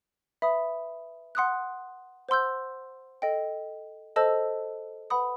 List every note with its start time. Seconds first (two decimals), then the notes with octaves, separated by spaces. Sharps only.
0.42 B4 E5 B5 D#6
1.35 F#5 C6 D#6 F#6
2.29 C5 F#5 C6 E6 G6
3.22 A4 D#5 G5
4.16 A4 C5 D#5 A5 E6
5.10 B4 F#5 B5 D#6